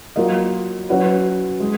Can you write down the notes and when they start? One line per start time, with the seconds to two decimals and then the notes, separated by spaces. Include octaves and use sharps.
0.16 F#3 A#3 F4 A#4 D#5
0.89 F#3 C#4 F#4 B4
1.60 G#3